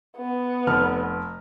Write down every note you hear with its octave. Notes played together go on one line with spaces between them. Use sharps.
B3
F1 F6